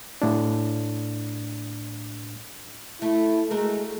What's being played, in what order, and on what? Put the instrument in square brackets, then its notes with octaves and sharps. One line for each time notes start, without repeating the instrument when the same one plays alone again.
[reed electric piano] A2 D4
[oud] A3 [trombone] E4
[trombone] G#3 [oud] A3 F#4 A#4